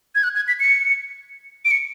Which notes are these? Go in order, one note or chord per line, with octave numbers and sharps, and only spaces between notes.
G#6
F#6
G#6
B6
C#7
D7
C#7